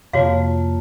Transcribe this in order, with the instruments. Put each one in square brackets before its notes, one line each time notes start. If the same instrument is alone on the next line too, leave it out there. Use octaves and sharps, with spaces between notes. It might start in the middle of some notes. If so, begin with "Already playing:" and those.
[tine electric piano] F2 C3 [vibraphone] A#3 F4 A5 [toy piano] F#4 C#5 F5